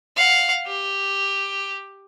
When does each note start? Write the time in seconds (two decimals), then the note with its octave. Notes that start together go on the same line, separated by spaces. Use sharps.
0.16 F5 F#5
0.67 G4